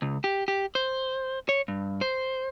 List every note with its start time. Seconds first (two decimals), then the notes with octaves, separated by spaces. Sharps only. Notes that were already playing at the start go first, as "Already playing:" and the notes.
0.02 C#2
0.24 G4
0.48 G4
0.75 C5
1.49 C#5
1.68 G2
2.01 C5